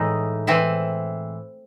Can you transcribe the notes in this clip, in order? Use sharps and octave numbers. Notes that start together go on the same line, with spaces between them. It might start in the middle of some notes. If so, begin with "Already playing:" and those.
Already playing: A2 E3 G#3 D#4
E3 C4 E4